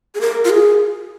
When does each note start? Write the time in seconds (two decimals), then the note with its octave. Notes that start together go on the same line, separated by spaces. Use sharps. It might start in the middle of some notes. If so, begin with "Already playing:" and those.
0.15 G#4
0.21 A#4
0.45 F4
0.50 G#4